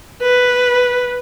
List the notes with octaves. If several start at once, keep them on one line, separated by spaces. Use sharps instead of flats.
B4